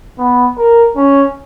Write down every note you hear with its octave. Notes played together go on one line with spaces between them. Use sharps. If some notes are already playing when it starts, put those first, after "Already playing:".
B3
A#4
C#4